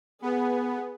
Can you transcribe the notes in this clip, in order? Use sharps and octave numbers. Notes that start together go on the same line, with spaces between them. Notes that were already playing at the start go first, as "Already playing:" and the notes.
B3 G#4